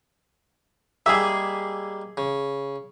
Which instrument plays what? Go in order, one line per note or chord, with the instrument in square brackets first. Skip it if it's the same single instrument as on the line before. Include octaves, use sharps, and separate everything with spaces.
[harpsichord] G3 G#3 A#3 [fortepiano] G#4 E5
[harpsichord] C#3